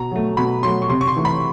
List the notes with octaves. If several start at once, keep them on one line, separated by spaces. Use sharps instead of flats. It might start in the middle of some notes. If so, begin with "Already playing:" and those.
Already playing: B2 A#5
F#3 A3
B2 B5
F#3 A3 C6
C#6
C3 C6
C#6
C6
E3 A3
B5